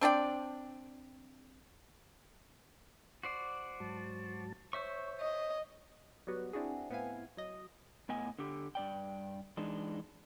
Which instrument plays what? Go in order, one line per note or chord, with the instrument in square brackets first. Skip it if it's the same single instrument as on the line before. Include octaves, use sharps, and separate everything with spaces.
[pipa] C4 D4 D5 G5
[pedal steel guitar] F#4 C5 D5
[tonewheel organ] G#2 F#3 A5
[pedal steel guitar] C5 E5 C#6 [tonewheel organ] C#5
[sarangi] D#5
[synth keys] F#3 G3 B3 F#4
C4 D4 E4 F#4 G#4
A2 B3 C4 E4 F5 G#5
F#3 D#5
[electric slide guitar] A2 B3 D#5 G#5
D3 G4
G2 D5 G5
E3 G#3 D4 D#4